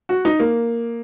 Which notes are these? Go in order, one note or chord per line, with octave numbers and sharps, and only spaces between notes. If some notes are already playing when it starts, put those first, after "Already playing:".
F#4
D#4
A#3